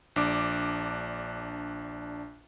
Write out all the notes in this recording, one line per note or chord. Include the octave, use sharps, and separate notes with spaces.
A#1 D4 D6